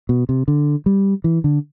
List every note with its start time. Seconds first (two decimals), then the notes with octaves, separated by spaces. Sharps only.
0.09 B2
0.29 C3
0.48 D3
0.86 G3
1.24 E3
1.44 D3